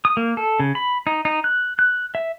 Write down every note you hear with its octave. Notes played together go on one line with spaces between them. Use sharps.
D#6
A#3
A4
C#3
B5
D#4
D#4
F#6
F#6
E5